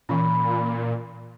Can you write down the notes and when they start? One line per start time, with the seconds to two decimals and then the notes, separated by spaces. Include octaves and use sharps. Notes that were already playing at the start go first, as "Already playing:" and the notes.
0.09 A#2 E3 C#4 B5 C6